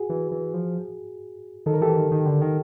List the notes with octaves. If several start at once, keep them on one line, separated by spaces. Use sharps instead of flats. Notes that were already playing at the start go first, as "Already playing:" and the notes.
Already playing: F#4 G#4
E3
E3
F3
D#3 A4
A#4
E3 G4 A4
D#3
D#3
D3
D#3